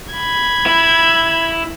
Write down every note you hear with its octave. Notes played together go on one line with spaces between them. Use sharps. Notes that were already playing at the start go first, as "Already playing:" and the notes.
B5 G#6
E4